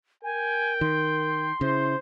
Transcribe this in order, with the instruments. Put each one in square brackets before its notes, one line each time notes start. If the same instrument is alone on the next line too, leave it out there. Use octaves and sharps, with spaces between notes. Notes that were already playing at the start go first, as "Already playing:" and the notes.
[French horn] A#4 [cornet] G5 [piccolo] G#5
[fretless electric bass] D#3 [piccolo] C6
[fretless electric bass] C#3 [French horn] E4 [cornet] C5